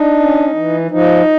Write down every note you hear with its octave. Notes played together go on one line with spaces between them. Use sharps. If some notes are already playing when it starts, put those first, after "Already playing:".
Already playing: D4 D#4
C#4
E3
F3 D#4